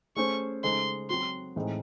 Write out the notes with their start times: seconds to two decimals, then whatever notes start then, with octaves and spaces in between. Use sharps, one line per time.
0.16 A3 C#4 G#4 C5 C#6
0.63 C#3 G#3 D#4 A4 C5 C6
1.10 F#3 C4 F#4 C6
1.56 A2 E3 G#3 C4 D#4